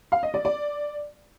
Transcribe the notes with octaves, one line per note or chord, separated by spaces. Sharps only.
F5
D#5
D5
D5